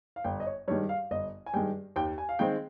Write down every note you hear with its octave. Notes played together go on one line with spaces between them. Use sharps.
F5
G1 G5
D#5
C#5
G2 D#3 G#3 C#5
F5
G1 D#5
G#5
G2 D#3 G#3 G5
D#2 G5
G#5
F5
D#3 G#3 C4 G5